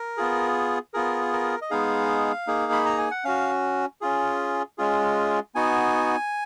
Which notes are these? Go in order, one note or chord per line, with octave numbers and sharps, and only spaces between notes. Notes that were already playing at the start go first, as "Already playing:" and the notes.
Already playing: A#4
B3 F4 G#4
B3 F4 G#4 A#4
A#4
D#5
G#3 B3 D#4 G#4 F5
A#3 D#4 G#4
B5
A#5
G#5
F#5
C#4 F#4 F5
C#4 F4 G#4
G#3 C#4 F4 G#4
B3 D#4 F#4 G#5